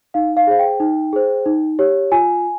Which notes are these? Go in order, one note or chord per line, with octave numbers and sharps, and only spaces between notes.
D#4 F5
F5
G#4 C5 F5
G5
D#4
G#4 C5
D#4
G4 C#5
F4 G#5